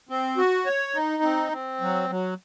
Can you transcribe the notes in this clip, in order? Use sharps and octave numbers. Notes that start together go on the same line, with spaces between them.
C4
F#4
C#5
D#4
C4
C4
F#3
F#3